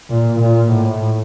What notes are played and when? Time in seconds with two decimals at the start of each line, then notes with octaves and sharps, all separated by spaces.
0.10 A#2
0.40 A#2
0.72 A2